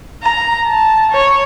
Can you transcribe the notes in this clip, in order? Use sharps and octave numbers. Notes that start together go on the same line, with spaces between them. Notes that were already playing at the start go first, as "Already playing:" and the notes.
A#5
A5
C#5